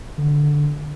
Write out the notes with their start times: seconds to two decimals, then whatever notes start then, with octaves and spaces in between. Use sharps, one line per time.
0.18 D3